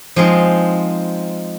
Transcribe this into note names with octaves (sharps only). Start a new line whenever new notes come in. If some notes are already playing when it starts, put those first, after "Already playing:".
F3 G#3 C4 D#4